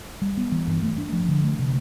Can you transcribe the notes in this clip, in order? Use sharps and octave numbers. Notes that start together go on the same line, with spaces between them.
G3
B3
E3
G2
A3
D4
F3
D3
A3
C3